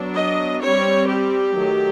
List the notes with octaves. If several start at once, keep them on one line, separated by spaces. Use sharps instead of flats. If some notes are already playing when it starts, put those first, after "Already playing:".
Already playing: F#3 B3 D4
D#5
G3 C4 C#5
G4
D#3 F#3 A3